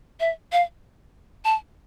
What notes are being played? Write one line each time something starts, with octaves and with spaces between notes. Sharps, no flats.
E5
F5
A5